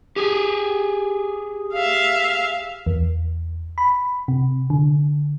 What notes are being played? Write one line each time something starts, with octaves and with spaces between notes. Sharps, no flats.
G4 G#4
E5 F5
E2
B5
C3
D3